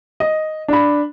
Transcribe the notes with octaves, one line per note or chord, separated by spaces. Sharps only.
D#5
D4 B5